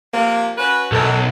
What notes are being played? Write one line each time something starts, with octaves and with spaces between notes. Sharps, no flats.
C3 F3 A#3
C#4 F#4 B4
B1 F#2 A4